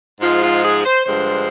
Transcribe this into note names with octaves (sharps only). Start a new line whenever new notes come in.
G#2 F3 G#3 F4
F4
G#4
C5
G2 D3 F3 G#3 C5